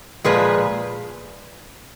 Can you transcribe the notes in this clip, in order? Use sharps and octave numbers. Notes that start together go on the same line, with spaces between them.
A#2 F3 G#3 G#4 B4